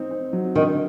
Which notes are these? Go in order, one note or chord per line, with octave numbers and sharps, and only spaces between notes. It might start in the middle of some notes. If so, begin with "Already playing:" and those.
Already playing: C4 D#4
C4
F#3
D3 D#3